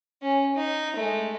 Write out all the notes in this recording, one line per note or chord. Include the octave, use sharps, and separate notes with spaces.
C#4
D#4
G#3 A3